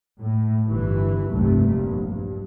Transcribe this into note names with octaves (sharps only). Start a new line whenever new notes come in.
A2
G1 E3
F1 C2 G2 A3
A#1 G2
G2